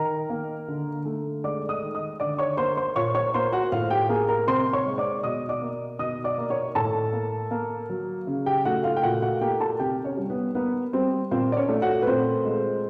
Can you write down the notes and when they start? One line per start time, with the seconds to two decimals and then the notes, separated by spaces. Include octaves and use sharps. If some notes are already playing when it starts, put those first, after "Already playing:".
Already playing: D#3 A#4 A#5
0.30 A#3
0.68 D3
1.05 A3
1.44 G#3 D5 D6
1.69 D#5 D#6
1.82 D#3
1.94 D#5 D#6
2.20 D3 D5 D6
2.38 C#5 C#6
2.57 A#3 C5 C6
2.77 C5 C6
2.96 A#2 C#5 C#6
3.15 C#5 C#6
3.34 A#3 C5 C6
3.52 F#4 F#5
3.72 A2 F4 F5
3.91 G4 G5
4.09 A#3 G#4 G#5
4.29 A#4 A#5
4.47 C3 C5 C6
4.73 C#5 C#6
4.86 G#3
4.98 D5 D6
5.23 B2 D#5 D#6
5.49 D5 D6
5.62 A#3
5.99 B2 D#5 D#6
6.24 D5 D6
6.38 A#3
6.50 C#5 C#6
6.75 A2 A4 A5
7.13 A#3
7.51 A#3
7.89 F#3
8.27 C#3
8.46 G4 G5
8.65 A3 F#4 F#5
8.84 F4 F5
8.97 G5
9.03 A#2 F#4 F#5
9.22 F#4 F#5
9.41 A#3 G4 G5
9.60 A4 A5
9.80 C3 G4 G5
10.04 C#4 C#5
10.17 G3
10.30 B3 B4
10.55 A#3 B3 B4
10.93 G3 C4 C5
11.31 A#2 C4 C5
11.52 D5
11.57 C#4 C#5
11.69 A3
11.82 F#4 F#5
12.02 B4
12.07 A#2 C4 C5
12.45 G#3